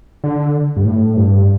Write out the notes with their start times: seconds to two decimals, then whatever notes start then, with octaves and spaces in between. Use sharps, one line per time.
0.24 D3
0.77 G2
0.85 A2
1.16 G2